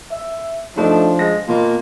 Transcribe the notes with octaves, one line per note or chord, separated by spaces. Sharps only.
E5
F3 A3 D4 D#4
G#3 A#6
B2 A#3 F4